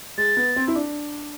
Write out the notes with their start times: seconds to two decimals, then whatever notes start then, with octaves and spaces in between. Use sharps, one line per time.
0.18 G#3 A6
0.37 B3
0.56 C4
0.68 E4
0.75 D4